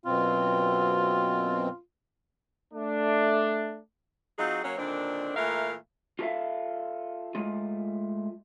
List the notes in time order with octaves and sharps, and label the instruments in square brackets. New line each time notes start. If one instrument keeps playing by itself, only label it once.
[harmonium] F#2 B2 C4 [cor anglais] F4
[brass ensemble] A3 D4
[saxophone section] F#3 C4 D#4 F4 F#4 G#4
F#3 A#3 C#4 F#4 C#5
A#2 D3 D#3 C4 D4
A#2 E3 A3 A#4 E5 F5
[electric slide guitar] F4 G4 A4 A#4 E5 F5
G#3 A3 F4